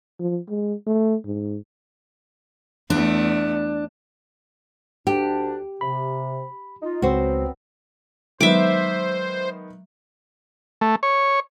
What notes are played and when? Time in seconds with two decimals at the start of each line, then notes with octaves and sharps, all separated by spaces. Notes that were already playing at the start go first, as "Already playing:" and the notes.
0.19 F3
0.49 G#3
0.87 A3
1.26 G#2
2.90 E2 A3 D4
5.07 D2 D4 G4
5.81 C3 B5
6.82 D#4 F4
7.02 C#2 F#3 B3 C4 F#4 C5
8.41 D#3 F#3 G#3 B3 C5 E5 D6
10.81 A3
11.03 C#5